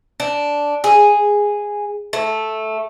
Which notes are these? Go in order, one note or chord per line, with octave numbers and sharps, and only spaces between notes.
D4
G#4
A3